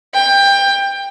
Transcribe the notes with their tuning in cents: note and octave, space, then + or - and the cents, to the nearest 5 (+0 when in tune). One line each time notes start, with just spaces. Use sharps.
G5 +20